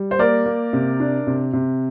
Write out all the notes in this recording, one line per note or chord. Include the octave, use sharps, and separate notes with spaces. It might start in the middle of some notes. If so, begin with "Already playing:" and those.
Already playing: G3
C5
A#3 A#4 D5
A#3
C3
D4
C3
C3